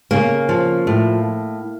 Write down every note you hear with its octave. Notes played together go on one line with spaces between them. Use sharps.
C#3 A#3
F3
A2